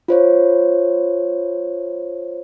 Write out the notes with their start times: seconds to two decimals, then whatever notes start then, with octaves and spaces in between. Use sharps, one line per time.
0.08 F4 C5 C#5